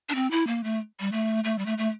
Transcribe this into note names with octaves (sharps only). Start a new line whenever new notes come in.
D4
C4
E4
A#3
A3
G3
A3
A3
G3
A3
A3